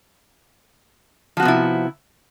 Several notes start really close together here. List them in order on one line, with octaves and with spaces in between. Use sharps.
F3 F#4 B3 C3 E4